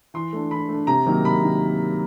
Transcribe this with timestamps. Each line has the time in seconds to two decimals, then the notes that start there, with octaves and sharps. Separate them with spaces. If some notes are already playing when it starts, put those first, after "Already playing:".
0.14 E3 C6
0.33 A3 D4
0.51 E3 B5
0.69 A3 D4
0.87 C3 A#5
1.06 D#3 F#3 A#3 D#4
1.24 C3 B5
1.43 D#3